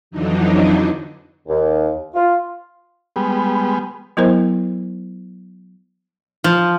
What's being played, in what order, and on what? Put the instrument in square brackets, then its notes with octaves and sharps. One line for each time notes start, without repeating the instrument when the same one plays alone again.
[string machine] F2 D3 E3 F#3 D4 D#4
[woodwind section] D#2
F4
[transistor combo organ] G3 G#3 B3
[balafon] F#3 B3 E4 A#4 C5
[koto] F3